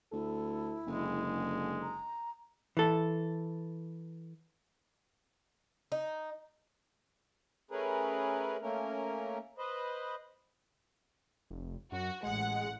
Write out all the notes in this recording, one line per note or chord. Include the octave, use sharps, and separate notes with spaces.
D2 E4 A4
F#1 D3 G#3
A#5
E3 A4
D#4
A3 C#4 G#4 A#4 B4
A3 A#3 C#4 A#4
B4 C5 D#5
F1
F#2 F#4
A1 G#3 F#5